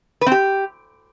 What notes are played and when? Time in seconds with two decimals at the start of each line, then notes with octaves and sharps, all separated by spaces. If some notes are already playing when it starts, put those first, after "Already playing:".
0.21 B4
0.27 C4
0.32 G4